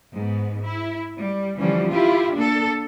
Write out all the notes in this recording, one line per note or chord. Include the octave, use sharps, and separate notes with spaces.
G#2 B3
E4
G3
D3 E3 F3 G3 C#4
E4 F4 G4
A#3 D4 A4